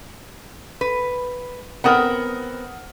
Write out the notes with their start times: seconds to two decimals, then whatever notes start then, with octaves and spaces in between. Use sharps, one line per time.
0.81 B4
1.84 B3 C4 A#4 F#5 D#6 F6